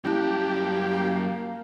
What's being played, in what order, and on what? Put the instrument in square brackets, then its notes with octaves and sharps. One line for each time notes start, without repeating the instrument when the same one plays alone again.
[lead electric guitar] F#2 A5 [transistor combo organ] G3 G4 [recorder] A#3 [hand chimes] C#4 E4 F#6